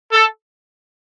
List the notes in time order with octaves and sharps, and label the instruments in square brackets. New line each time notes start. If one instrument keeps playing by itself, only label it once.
[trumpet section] A4